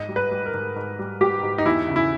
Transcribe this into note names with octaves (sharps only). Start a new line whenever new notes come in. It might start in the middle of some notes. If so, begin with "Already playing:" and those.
Already playing: G#2 D#5
G3
B4
G3
A#4
G#2
G#2
G3
G3 G4
G#2
D#4
E2 E4
C#3
E4